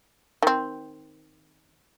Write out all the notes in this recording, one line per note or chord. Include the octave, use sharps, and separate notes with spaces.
D#3 C4